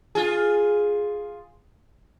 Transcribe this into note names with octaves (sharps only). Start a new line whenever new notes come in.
F4 G#4